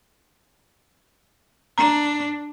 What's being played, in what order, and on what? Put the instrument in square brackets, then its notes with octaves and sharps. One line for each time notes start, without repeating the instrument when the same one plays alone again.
[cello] D4 [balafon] A#5